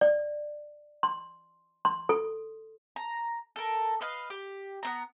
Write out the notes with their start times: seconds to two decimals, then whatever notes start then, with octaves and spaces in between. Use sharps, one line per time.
0.01 D5
1.03 C6
1.85 C6
2.09 A4
2.96 A#5
3.56 A4 A#4
4.01 B4 D#5 F5
4.30 G4
4.83 B3 C4 A#5